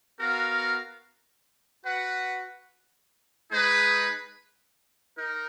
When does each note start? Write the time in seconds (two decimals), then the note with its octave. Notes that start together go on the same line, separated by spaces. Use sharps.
0.19 B3 F#4 A#4 F5
1.84 F#4 B4 F#5
3.50 G#3 D#4 G#4 B4
5.15 D#4 A#4